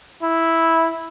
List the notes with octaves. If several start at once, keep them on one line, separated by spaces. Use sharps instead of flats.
E4